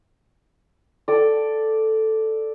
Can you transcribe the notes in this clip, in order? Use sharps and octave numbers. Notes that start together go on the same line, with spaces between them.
A4 D5